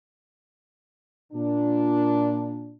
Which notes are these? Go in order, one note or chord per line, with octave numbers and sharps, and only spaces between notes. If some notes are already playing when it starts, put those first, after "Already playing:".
A#2 D4